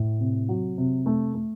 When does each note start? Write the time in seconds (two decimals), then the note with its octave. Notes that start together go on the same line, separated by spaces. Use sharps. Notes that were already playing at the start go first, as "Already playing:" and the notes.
Already playing: A2
0.20 C3
0.49 F#3
0.77 C3
1.06 A3
1.34 A3